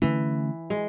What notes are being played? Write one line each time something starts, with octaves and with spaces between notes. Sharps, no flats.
D3 E3 A3 C#4
G#3